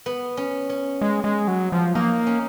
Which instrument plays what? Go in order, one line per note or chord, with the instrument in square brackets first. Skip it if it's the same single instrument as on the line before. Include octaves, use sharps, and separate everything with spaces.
[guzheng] B3
C#4
C#4
[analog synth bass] G#3
G#3
F#3
F3
[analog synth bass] A#3 [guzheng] D#4
[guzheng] C#4